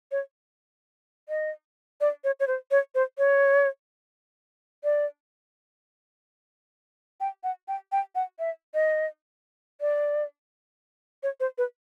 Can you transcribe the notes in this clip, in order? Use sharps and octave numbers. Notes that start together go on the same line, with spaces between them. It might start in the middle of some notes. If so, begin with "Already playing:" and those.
C#5
D#5
D5
C#5
C#5
C5
C#5
C5
C#5
D5
G5
F#5
G5
G5
F#5
E5
D#5
D5
C#5
C5
B4